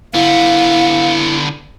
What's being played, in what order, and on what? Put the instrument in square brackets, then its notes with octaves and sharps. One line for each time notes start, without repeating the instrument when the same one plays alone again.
[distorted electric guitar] D3 B3 [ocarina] E4 [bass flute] F5